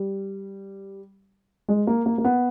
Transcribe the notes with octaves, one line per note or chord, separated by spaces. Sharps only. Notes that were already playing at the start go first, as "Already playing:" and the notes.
Already playing: G3
G#3
A#3
A#3
A#3
B3